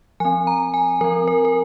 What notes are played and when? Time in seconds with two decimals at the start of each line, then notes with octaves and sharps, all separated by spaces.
0.20 F3 C4 G#5
0.47 A#5
0.74 G#5
1.01 F3 C4 A#4
1.28 A#4
1.45 A#4